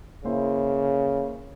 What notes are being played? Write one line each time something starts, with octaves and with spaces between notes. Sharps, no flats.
C#3 A#3 E4 C5